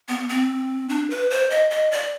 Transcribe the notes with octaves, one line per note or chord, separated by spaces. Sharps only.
B3
C4
D4
B4
C5
D#5
D#5
D5